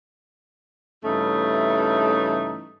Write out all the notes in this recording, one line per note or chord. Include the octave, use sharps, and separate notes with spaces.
G2 C#3 E3 A3 C#4 D#4